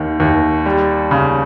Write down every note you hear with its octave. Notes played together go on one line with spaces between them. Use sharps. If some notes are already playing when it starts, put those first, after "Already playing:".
Already playing: D#2 D#3
D#2
G3
C#3